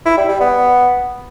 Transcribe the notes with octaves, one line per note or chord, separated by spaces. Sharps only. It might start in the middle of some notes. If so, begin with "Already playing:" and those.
E4
G3
G3
B3